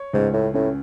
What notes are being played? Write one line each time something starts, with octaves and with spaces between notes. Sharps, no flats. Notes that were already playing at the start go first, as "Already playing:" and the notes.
Already playing: C#5
C#2 G#2
A2
A2 C#4